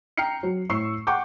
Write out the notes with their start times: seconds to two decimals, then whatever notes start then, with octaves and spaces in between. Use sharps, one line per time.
0.17 G5 A#5 F6 C7 C#7
0.43 F#3
0.69 A2 C#6 E6 C7
1.07 F#5 G5 C#6 D6 G6